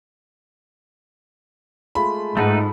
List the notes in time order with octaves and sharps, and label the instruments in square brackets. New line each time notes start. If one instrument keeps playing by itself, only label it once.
[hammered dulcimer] G#3 A3 F4 [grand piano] B5
[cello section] G#2 [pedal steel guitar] A3 D#4 B4 [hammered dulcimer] G#4 A4 F#5